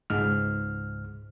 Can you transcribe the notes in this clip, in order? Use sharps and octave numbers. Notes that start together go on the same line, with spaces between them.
C#2 G#2 F6